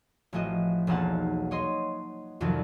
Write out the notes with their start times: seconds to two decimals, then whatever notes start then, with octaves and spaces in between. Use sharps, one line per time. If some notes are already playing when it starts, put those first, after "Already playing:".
0.33 A1 F3 A3 F#4 D#5
0.87 E1 B1 A#3 D#4 F#5 A5
1.51 C#5 D#5 C6
2.40 C2 F2 D#3 F3 F#3